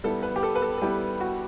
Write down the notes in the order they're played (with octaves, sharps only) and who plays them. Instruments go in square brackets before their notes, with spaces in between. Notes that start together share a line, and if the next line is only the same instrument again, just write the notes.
[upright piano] G3 B3 E4 [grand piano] A4
[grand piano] B4
G4
A4
B4
A4
A4
[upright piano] G3 B3 E4 [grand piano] G4
[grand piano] F#4